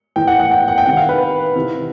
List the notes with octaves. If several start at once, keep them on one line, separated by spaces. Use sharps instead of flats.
A2 E3 G5
F#5
F#5
G5
F#5
G5
C3 D#3 F#5
F5
B4
C3 E3